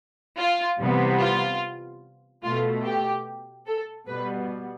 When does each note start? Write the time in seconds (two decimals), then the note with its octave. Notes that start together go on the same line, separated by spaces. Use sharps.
0.38 F4
0.79 C3 E3 G3 B3
1.19 F4
2.43 B2 A3 F4
2.84 G4
3.66 A4
4.07 B2 G3 B3 B4